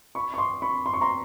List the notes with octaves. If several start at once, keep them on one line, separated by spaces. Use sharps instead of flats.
B5 C#6
C#6
C6 D6
B5 C#6
C6
C#6
A#5 C6